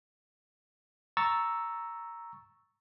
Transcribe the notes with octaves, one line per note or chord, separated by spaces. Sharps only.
A#5 C#6 E6 A6